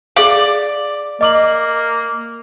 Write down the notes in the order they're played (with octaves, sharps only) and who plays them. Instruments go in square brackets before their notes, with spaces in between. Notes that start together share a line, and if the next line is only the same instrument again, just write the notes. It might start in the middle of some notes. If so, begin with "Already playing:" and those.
[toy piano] G#4 F5 [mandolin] D5
[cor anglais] A#3 [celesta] D#5 D6 F#7